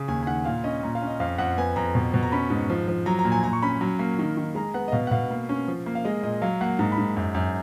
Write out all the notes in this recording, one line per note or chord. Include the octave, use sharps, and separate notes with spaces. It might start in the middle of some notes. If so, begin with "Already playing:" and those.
Already playing: C#3
D#2 G#5
G#5
D#3 F#5
A#2 F5
C#4 D#5
A#2 A#5
F5
C#4
D#5
F2 F5
F2 F#5
B3 G#5
F2 A#5
B2
B2
A#5
C#4 B5
G#2
F3
F3
F#3 A#5
A#5
A#2
G#5
A#2 A#5
C#6
C#4 B5
F#3
A#3
D#3
D#3
G#3 A#5
B3 F#5
D#5
B2 F5
F#5
B2 F5
A#3
C#4
F3
A#3
F5
G#3 D#5
A#2 D#5
F#3 F5
A#3 F#5
G#2 A#5
B5
G#2
F#2
F#2